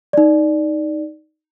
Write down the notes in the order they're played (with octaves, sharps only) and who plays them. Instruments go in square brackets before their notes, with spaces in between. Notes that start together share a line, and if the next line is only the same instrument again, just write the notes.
[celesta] D#4 D5